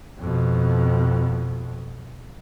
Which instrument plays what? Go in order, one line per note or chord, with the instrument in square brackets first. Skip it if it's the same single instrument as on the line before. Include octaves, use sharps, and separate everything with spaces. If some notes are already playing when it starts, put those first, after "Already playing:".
[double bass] F2 B2